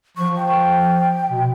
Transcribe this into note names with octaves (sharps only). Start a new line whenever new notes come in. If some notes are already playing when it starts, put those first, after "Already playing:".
F3 C#6
G5
B2